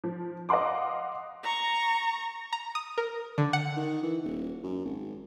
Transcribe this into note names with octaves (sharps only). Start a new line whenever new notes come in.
F3
D#5 F5 F#5 C6 D6
A#5 C#6
A#5
D#6
A#4
D3
F#5
D#3
E3
D#1
F#2
G#1